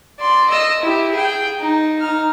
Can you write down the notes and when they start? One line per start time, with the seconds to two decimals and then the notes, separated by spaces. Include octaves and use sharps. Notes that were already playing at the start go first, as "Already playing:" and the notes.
0.20 D5 C6
0.50 D#5 E6
0.82 E4 G4
1.12 G#4 G5
1.60 D#4
2.01 D#4 F6